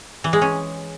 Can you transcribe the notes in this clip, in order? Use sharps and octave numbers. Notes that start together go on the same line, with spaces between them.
E3
G#3
C#4